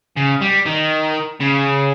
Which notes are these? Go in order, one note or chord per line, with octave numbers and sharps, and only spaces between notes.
C#3
G3
D#3
C#3